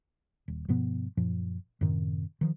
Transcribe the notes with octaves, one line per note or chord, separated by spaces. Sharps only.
D#1
G2 B2 F3 B3
F#2 A#2 F3
F#2 A2 C3 D#3
D#3 F3